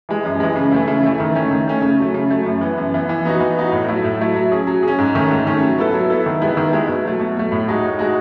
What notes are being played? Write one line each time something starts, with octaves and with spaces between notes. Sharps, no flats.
E3 G#3
F#2
E3 G#3
C#3
E3 A3 E4
C#3
E3 A3 E4
D#3
A3 C#4
D#3
A3 C#4
C#3
F#3 A3
C#3
F#3 A3
F#2
E3 B3
F#2
E3 B3
E3
B3 D#4 F#4
E3
B3 D#4 F#4
A2
F#3 A3 E4
A2
F#3 A3 E4
F#3
C#4 G#4
F#3
C#4 G#4
G#2
D#3 A3 C#4
G#2
D#3 A3 C#4
F#3
B3 E4 A4
F#3
B3 E4 A4
D#3
G#3 B3 E4
D#3
G#3 B3 E4
B2
F#3 A3
B2
F#3 A3
A2
G#3 D#4 F#4
A2
G#3 D#4 F#4